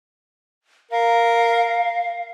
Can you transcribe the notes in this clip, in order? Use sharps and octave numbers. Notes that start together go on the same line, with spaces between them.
A#4 F5